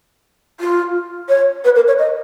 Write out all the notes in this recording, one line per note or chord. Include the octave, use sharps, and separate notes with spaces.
F4
C#5
B4
A#4
C#5
D#5